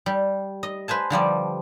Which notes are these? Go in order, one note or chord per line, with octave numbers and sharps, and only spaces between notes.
G3
D#5
B4 C5 G#5 A5
D3 F3 G3 D5